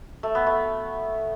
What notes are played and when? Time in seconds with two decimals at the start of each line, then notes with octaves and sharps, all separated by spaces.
0.23 A3
0.35 B3
0.47 A3